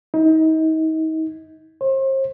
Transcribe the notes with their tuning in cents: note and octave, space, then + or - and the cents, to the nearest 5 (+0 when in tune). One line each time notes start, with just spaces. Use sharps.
D#4 +35
C5 +40